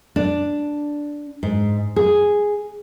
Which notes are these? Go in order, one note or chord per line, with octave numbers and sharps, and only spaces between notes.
D4
G#2
G#4